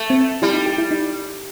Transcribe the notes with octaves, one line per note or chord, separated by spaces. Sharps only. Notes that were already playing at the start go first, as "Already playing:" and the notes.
Already playing: A3
C4
G3 E4
D#4
G4
E4
D#4